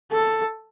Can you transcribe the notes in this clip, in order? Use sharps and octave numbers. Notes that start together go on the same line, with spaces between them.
A4